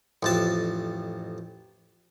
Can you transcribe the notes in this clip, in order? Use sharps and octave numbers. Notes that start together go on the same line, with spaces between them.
A1 F2 A5